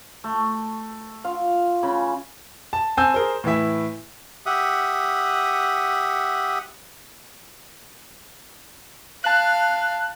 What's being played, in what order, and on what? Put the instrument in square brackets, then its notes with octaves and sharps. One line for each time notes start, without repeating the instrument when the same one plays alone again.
[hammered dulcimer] A3
F4 F5
C#3 B5
[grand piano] A5
C4 G#5 A5 E6 G6
G#4 A#4 C5
A2 E3 E4 E5
[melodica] G4 E5 F#5 D#6
[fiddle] F5 [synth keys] A5 F#6